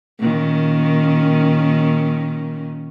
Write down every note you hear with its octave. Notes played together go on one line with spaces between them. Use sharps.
A#2 D#3 C#4